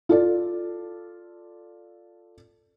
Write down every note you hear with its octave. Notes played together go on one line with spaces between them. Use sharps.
F4 A4 D5